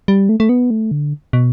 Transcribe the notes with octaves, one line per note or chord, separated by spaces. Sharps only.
G3
A3
A3
B3
A3
D3
B2